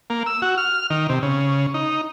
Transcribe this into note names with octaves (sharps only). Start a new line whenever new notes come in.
A#3
E6
F#4
F6
D#3
C3
C#3
D#4